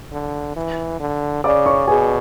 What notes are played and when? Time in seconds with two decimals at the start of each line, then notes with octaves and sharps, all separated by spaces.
0.12 D3
0.56 E3
1.00 D3
1.44 C#3 D5 D6
1.66 C#5 C#6
1.87 B2 G#4 G#5